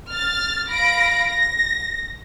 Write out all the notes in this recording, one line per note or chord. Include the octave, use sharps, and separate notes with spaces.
F6 A6
F5 B5 A#6 D7
A#6